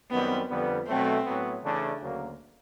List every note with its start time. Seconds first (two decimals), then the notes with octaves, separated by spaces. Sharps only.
0.11 F#2 D#3 G3 B3 C4
0.49 F2 D3 G3 B3
0.87 B2 F#3 A3 C4
1.25 A2 F#3 B3
1.62 C#3 E3 A3 D4
2.01 D2 C#3 F#3 A#3